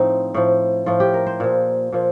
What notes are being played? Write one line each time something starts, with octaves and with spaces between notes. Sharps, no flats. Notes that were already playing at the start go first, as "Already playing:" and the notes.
Already playing: A2 F3 C4 D#4
A2 F3
A2 F3 F4
G4
A#4
C5
A#2 F3
A#2 F3